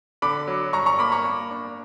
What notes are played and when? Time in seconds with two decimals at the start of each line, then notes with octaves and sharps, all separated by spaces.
0.22 D3 B5 D6
0.47 F#3
0.73 G2 A#5 C#6
0.86 A#5 C#6
0.99 A#3 B5 D6
1.12 A#5 C#6
1.25 A#3
1.51 D4